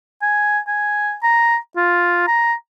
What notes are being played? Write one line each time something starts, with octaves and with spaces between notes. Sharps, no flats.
G#5
G#5
A#5
F4
A#5